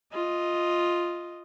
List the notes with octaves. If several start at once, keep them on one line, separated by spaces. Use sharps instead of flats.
F4 D#5